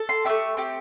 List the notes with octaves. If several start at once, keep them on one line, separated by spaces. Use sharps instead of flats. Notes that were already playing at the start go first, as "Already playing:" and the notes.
Already playing: A4
C6
A3 D4 G4 E5
A3 C4 G4